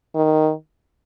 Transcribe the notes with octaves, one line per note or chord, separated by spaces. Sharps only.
D#3